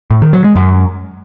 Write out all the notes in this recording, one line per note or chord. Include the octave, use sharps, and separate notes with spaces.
A2
D#3
F#3
G#3
F#2